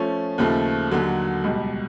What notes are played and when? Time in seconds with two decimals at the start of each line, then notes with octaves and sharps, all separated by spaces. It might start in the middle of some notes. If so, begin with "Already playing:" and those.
Already playing: F3 A3 C#4
0.38 D#2 C#3 F3 A3
0.91 D#2 D3 F#3
1.44 C#2 B2 G3